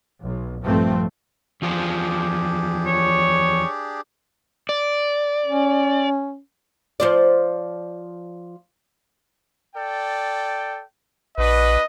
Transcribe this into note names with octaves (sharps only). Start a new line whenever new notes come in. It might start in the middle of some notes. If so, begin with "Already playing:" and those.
B1
A#1 G2 F3 A3 C4
E2 F3 D4 F4 G4 G#4
C#5
D5
C#4
F3 C5 D5
A4 D5 G5
A#1 D4 F#4 B4 D#5